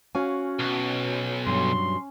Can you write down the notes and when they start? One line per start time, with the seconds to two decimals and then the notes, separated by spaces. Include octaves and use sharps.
0.15 C#4 F#4 F5 G#5
0.60 B1
1.47 G2 B2 F#3 C6